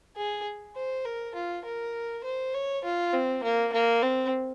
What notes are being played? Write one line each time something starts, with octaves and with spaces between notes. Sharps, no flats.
G#4
C5
A#4
F4
A#4
C5
C#5
F4
C4
A#3
A#3
C4